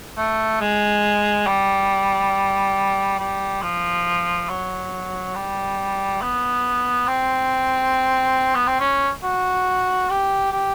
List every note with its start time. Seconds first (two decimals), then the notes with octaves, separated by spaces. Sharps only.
0.17 A3
0.60 G#3
1.47 G3
3.19 G3
3.62 F3
4.49 F#3
5.35 G3
6.22 B3
7.07 C4
8.55 B3
8.67 C4
8.80 C#4
9.23 F#4
10.10 G4
10.52 G4